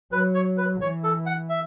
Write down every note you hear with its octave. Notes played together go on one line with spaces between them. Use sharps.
F#3 B4
C#5
B4
E3 C#5
A4
F#5
E5